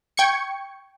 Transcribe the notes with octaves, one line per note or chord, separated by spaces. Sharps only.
G5 C#6 G#6 C#7